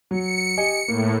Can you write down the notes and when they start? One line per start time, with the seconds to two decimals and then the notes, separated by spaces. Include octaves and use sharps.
0.11 F#3 C#7
0.58 G4 D#5 G#5
0.88 A2 A#3